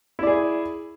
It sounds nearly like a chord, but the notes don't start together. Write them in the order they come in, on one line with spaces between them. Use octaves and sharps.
E4 D5 G#4